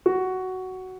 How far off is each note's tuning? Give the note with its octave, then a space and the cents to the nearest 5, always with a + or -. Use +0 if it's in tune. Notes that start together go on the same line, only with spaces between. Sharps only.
F#4 +10